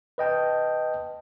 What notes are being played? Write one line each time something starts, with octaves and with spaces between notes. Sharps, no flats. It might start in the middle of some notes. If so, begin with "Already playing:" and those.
B4 D#5 G5 A5